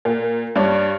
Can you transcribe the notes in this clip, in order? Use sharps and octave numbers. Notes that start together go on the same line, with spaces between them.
A#2
G2 D4 C#5